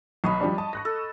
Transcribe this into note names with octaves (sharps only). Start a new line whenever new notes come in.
B1 C#5 D#5 B5
F3 G3 D4
D#5 A5
C#6 F#6 A#6
A4